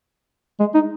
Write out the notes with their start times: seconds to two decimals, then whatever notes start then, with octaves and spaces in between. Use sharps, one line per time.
0.60 G#3
0.74 D#4